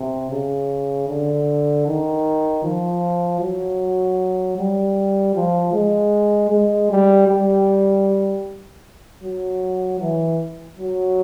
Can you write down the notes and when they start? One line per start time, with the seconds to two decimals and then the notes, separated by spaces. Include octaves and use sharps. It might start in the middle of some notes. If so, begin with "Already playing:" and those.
Already playing: C3
0.31 C#3
1.09 D3
1.87 D#3
2.64 F3
3.41 F#3
4.58 G3
5.36 F3
5.73 G#3
6.51 G#3
6.91 G3
7.28 G3
9.23 F#3
10.00 E3
10.77 F#3